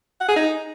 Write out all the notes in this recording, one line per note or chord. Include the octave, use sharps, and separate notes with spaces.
F#5
G#4
D#4